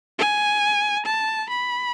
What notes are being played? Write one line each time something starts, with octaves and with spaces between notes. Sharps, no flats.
G#5
A5
B5